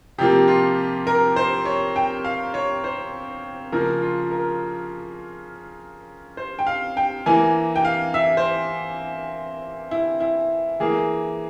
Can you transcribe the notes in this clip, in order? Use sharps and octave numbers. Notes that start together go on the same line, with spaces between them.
C3 F3 A#3 G4
F4
A#4
C5
C#5
G5
F5
C#5
C5
C#3 F3 A#3 A#4
F4
A#4
C5
G5
F5
G5
E3 A#3 G#5
G5
F5
E5
C5
E4
E4
E3 A#3 G#4